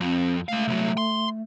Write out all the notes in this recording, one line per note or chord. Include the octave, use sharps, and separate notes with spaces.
F2 C4
G#3 A3 F5
C2 F#3
C6